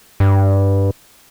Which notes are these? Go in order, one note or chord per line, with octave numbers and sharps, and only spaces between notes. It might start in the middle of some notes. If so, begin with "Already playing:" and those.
G2